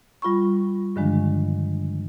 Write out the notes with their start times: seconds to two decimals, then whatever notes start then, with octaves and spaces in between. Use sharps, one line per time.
0.22 G3 F4 B5 C#6
0.96 G2 D3 D#3 F3 G#3 D4